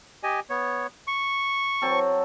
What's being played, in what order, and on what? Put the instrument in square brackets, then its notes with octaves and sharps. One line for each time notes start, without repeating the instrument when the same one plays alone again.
[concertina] G4 D#5 G#5
B3 C#5
C#6
[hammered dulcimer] F#3 C4 A4